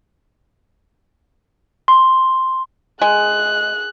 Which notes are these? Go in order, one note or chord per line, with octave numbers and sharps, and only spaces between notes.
C6
G#3 G#4 F#6